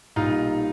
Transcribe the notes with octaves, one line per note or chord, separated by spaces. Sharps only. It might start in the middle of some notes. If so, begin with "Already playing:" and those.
B1 A#2 G3 D#4 F4